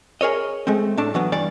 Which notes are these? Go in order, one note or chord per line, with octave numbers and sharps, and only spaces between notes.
G#4 A#4 C#5 D#5
G#3 A3 C4
A2 A3 D4 A5
E3 F#3 B3
G2 E3 D5